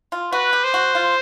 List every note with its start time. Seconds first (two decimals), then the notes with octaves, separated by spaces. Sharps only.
0.12 F4
0.33 F#4 B4
0.53 G4
0.64 C5
0.74 F#4
0.95 F4